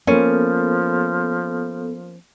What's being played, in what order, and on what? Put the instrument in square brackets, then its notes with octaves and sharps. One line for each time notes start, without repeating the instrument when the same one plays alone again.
[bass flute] F3 [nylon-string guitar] A#3 [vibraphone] B3 A4 [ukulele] C#4